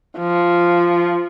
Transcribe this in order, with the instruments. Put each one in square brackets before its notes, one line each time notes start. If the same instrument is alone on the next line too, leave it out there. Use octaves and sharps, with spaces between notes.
[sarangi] F3